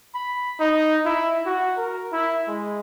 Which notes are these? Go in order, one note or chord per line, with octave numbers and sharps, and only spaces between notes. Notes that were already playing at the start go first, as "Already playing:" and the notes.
B5
D#4
E4
F#4
A#4
E4
G#3